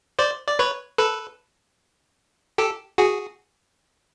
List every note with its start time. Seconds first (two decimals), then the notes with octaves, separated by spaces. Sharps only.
0.19 C5 D5
0.48 D5
0.59 B4 C#5
0.98 A4 B4
2.58 G4 A4
2.98 F#4 G#4